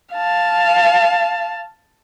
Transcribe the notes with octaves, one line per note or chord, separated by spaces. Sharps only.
F5 A5